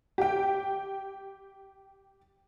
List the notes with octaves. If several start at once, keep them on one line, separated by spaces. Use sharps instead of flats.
G4 G5